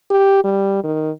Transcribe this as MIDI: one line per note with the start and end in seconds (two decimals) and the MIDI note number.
0.10 0.44 67
0.44 0.82 55
0.84 1.11 51